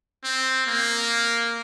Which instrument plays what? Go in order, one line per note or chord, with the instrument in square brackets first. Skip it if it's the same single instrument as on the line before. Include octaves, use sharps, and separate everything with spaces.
[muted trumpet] C4
A#3